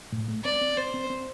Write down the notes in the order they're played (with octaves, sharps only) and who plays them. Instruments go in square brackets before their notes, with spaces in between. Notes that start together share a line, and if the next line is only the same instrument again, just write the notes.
[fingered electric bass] A2
A3
[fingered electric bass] C4 [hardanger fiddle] D5
[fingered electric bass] C4
[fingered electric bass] C4 [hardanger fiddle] C5
[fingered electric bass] C4
C4